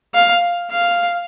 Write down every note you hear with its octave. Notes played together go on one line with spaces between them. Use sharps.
F5
F5